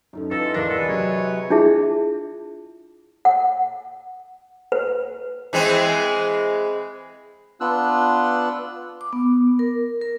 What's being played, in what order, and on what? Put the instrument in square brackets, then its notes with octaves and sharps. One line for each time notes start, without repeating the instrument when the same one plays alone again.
[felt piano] F#2 [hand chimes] C#4 D#4 A4
[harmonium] E3 F4 [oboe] A4 [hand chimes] B4 D#5 [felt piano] A#6
[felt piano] E2 A#4 A#6 [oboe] D4 [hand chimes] D5 E6
[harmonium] C3 G#3 B4 [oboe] A4 [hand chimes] D#5 F#5
[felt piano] F#3 [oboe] C#5
[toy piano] D4 E4 F4 G#4 E5
F#5
B4
[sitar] E3 G#3 C4
[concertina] B3 D4 F4 E6 F#6
[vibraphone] D6
B3
A#4
A#4